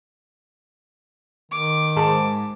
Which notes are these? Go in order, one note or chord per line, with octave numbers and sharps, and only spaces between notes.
D#3 D6
G#2 A5